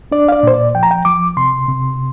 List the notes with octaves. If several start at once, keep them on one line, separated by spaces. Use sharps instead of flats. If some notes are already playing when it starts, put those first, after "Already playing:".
D4 D5
F5
D5
A#2 C5
D5
F3 G5
A#5
G5
F3 D6
C3 C6
C3